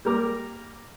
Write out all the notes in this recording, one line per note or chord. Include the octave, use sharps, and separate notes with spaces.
G3 A#3 A#4 D6